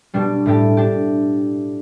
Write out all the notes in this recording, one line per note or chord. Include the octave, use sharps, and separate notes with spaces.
B2 G3 D4 G4
A2 A3 D4 G4
D4 G4